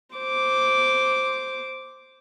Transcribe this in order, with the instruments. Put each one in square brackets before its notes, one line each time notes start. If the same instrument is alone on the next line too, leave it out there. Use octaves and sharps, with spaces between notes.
[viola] C5 D6